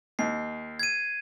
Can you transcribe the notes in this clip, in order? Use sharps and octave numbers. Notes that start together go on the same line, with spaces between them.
D#2 C7
G#6 D#7